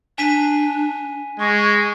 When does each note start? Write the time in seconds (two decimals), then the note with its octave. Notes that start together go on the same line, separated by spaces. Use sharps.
0.18 D4 G#5 B6 D#7
1.40 G#3 C#6